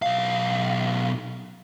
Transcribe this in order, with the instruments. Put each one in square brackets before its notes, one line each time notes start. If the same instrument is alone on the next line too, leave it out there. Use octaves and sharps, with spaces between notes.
[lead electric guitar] B1 F5